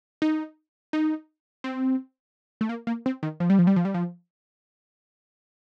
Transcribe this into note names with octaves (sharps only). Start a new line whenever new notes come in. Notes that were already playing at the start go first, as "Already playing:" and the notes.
D#4
D#4
C4
A3
A#3
A#3
C4
D#3
F3
G3
F3
G3
F3
G3
F3